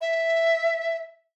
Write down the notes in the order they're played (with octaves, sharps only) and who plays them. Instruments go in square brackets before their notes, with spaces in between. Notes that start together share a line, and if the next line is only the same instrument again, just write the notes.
[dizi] E5